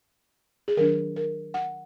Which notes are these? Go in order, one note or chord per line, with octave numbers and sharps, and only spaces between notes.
G#4
D#3 F#3 D4 A#4
A#4
F#5